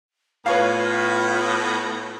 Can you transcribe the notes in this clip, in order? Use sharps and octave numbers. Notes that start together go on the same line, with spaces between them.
A2 B3 F4 B4 C#5 F5